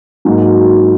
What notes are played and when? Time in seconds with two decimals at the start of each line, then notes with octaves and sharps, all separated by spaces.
0.25 G#2 F#3 A#3 D#4